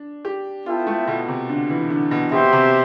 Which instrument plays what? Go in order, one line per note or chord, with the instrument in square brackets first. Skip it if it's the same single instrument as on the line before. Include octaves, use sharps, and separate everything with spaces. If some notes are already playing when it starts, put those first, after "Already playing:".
Already playing: [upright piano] D4
G4
[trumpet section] B3 E4 A4 E5 G5 [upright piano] F4
[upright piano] A3
B2
C3
D3
E3
D3
B2
[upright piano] B2 [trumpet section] C4 G4 C5 E5
[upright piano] C3